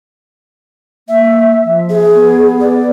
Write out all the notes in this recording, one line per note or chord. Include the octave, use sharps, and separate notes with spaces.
A#3 E5
F3
G#4
B3
D5